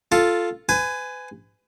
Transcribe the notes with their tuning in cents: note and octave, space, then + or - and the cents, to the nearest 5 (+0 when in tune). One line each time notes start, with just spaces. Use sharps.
F4 +0 A4 +0
B4 +35 G#5 +0